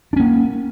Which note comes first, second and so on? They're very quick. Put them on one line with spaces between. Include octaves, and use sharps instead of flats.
D4 C#4 A#3